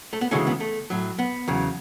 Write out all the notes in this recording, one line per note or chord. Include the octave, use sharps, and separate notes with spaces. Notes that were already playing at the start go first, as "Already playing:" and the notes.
A3
B3
D2 C#3 E3 G#3 A3 C#4
B3
A3
A2 F#3
B3
E2 C#3 F#3